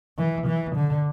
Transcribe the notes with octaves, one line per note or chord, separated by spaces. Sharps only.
E3
E3
D3